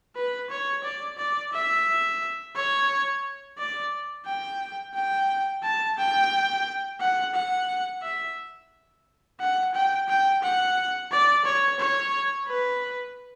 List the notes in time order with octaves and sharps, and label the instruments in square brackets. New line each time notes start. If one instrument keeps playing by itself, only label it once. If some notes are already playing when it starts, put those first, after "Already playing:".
[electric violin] B4
C#5
D5
D5
E5
C#5
D5
G5
G5
A5
G5
F#5
F#5
E5
F#5
G5
G5
F#5
D5
C#5
C#5
B4